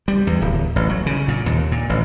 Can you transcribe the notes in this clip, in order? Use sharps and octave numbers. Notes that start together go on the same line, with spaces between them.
G3
E2
D1
A1
F#3
C#3
A#2
D#2
A#2
A1